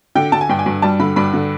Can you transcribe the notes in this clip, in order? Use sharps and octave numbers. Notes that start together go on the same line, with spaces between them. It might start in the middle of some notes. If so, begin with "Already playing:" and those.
D3 G5
D3 A5
G#5
G2 G5
G#5
G2
G3 A5
D3 B5
G2 B5
D3